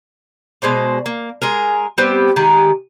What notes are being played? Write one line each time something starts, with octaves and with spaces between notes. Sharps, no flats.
B2 G#3 C5 D5
A#3
G#3 G#4 A#4
G3 B3 C4 G4
D#3 G#3 G4 G#4